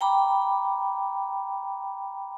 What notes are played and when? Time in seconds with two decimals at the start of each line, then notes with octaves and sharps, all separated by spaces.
0.01 G5 A#5 B5 D6